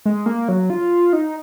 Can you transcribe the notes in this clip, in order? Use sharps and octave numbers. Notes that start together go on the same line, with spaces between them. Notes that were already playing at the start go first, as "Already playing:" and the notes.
G#3
A#3
F#3
F4
D#4